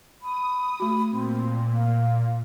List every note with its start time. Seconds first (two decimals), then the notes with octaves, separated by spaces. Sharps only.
0.22 B5 D#6
0.80 A3 F#4
1.11 A#2 C4
1.73 F5